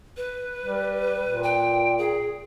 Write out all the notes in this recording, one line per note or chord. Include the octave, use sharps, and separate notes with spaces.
B4
G3
A#2
G5
G#4